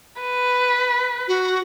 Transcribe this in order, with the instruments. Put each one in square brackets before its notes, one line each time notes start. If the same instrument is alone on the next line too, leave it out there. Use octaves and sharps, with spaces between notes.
[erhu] B4
[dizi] F#4